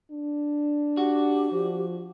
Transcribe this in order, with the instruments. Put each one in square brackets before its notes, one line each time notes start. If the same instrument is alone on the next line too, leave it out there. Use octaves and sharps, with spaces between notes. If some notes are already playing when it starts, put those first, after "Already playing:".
[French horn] D4
[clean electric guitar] F#4 [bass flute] G4
[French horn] F3